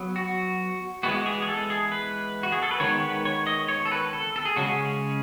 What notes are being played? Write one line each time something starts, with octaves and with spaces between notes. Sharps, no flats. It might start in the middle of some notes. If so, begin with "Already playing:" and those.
Already playing: F#3 B3
F#4
E3 G#3 B3 F#4
G#4
G#4
A4
G#4
B4
F#4
G#4
A4
B4
D#3 G#3 B3 C#5
B4
C#5
D#5
C#5
A4
B4
A4
A4
G#4
C#3 G#3 C#4 F#4
G#4